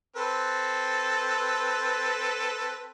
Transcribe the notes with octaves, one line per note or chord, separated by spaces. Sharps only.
C4 A4 B4